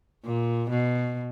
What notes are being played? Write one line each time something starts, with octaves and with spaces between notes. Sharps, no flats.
A#2
B2